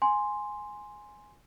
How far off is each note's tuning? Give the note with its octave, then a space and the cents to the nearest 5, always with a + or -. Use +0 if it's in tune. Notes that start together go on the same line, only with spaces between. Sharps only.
G#5 +0 C6 +0